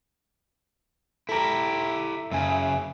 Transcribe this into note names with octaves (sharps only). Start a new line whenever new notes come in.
E4 G4 A4 A#5
F#2 C#3 E5 G#5